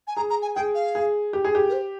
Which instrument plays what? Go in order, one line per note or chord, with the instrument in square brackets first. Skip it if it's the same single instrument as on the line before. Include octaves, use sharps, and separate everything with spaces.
[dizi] G#5
[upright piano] G#4 [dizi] A#5
[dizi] A#5
G#5
[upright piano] G#4 [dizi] G5
[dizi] F5
[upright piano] G#4
G4
G#4
G4
[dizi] A#4
C5